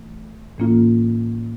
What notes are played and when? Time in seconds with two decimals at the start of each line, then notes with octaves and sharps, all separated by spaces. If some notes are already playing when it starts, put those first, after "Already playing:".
Already playing: E3 A3
0.58 A2 E3 A#3 C#4 F4